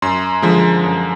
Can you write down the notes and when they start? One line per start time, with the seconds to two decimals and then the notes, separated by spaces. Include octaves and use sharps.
0.02 F#2 C6
0.42 D3 F3 G#3
0.84 F#2